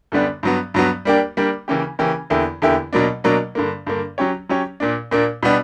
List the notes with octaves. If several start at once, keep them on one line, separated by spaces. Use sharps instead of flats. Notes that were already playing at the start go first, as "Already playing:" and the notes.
F#2 D3 G3 B3 D4
G2 F#3 B3
G2 F#3 B3
G3 A#3 D4 G4
G3 A#3 D4 G4
C#3 E3 A#3 C#4 G4
C#3 E3 A#3 C#4 G4
E2 D3 A#3 E4 G4
E2 D3 A#3 E4 G4
B2 F#3 A#3 D4
B2 F#3 A#3 D4
G2 D3 A#3
G2 D3 A#3
F#3 C#4 G4 C#5
F#3 C#4 G4 C#5
A#2 A#3 D4
A#2 A#3 D4
B2 G3 B3 D4